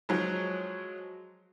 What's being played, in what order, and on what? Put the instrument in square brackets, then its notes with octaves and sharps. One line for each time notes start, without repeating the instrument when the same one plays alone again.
[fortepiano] F3 F#3 G#3